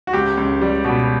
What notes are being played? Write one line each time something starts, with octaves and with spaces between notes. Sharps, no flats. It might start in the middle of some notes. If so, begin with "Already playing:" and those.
F#4
C#2 G4
C#2
G3
B2